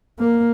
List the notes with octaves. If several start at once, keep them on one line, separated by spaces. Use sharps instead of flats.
A#3